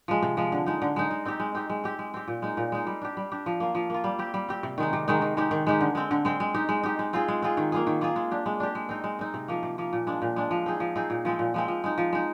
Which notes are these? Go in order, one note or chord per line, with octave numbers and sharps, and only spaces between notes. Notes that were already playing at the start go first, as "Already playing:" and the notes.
F3 G#3
C3
F3 G#3
D3
G#3 D#4
D3
G#3 D#4
G#3
C4 D#4 G4
G#3
C4 D#4 G4
G#3
C4 G4
G#3
C4 G4
A#2
G#3 D#4
A#2
G#3 D#4
G3
D4 G4
G3
D4 G4
F3
A#3 F4
F3
A#3 F4
G3
C4 G4
G3
C4 G4
C3
D#3 G#3 D#4
C3
D#3 G#3 D#4
D#3
G#3 D#4 G4
D#3
G#3 D#4 G4
D3
G#3 C4
D3
G#3 C4
G#3
D#4 G4
G#3
D#4 G4
G#3
C4 F4 G#4
G#3
C4 F4 G#4
D#3
A#3 F4 G#4
D#3
A#3 F4 G#4
G#3
D4 G4
G#3
D4 G4
G#3
C4 D#4
G#3
C4 D#4
C3
F3 A#3
C3
F3 A#3
A#2
G#3 D4
A#2
G#3 D4
F3
C4 D#4 G#4
F3
C4 D#4 G#4
A#2
F3 G#3 C4
A#2
F3 G#3 C4
F3
G#3 D#4
F3
G#3 D#4